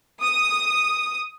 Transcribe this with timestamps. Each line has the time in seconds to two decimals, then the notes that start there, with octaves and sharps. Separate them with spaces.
0.23 D#6